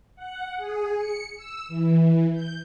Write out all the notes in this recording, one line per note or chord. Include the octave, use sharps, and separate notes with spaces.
F#5
G#4
C#7
E6
E3
G6